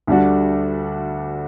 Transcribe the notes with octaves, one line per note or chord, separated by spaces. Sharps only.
D2 D3 G3 D4 F#4